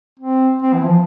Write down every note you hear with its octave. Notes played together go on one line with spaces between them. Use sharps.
C4
C4
E3
F3